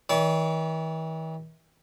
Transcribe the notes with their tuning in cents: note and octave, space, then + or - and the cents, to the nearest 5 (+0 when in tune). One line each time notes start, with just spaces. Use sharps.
E3 -45 D5 -40 A5 -35